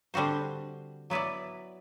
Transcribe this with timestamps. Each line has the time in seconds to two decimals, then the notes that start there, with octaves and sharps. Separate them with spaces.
0.14 D3 G3 C4 F#4 C5
1.10 F#3 B3 E4 B4 D5